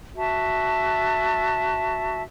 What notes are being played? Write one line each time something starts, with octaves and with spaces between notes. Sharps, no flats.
F#4 E5 A5